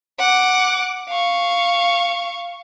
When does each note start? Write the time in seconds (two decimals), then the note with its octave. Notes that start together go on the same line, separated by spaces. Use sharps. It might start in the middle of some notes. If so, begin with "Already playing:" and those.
0.20 F#5 D6
1.09 F5 C#6